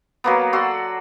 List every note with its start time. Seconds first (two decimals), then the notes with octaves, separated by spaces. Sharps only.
0.24 F#3 A#3 B3
0.53 F#4 A4 D5 C6